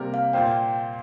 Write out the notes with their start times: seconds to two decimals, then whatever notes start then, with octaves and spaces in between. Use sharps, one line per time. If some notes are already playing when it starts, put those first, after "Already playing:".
Already playing: C3 G3 A#3 G4 A#4
0.14 F5
0.33 A#2 A#3 F4 C5 G5